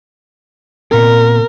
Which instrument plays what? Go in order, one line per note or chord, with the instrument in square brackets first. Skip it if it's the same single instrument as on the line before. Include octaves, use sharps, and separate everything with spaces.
[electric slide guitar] A#2 B3 C4 [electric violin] A#4